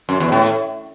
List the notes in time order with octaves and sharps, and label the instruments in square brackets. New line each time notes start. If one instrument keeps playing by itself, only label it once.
[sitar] F#2
E2
A2